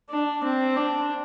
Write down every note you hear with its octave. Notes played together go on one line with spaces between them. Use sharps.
D4
C4
D4